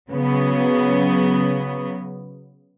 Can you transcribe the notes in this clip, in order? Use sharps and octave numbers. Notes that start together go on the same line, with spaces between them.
C#3 F#3 B3